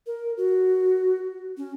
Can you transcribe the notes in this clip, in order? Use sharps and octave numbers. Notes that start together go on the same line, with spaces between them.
A#4
F#4
C#4